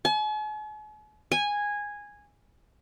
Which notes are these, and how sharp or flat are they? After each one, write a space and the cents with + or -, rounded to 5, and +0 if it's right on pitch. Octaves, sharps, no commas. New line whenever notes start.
G#5 +45
G#5 -10